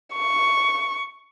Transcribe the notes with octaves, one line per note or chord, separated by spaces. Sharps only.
C#6